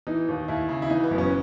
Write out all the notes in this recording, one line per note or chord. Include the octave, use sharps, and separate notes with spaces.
E3 D#4
D#2
D#2 E4
C#3
E4
E3 D#4
B3
F#1
C#4